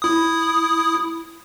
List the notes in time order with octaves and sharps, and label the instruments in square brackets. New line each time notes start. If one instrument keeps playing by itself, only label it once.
[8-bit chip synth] E4 D#6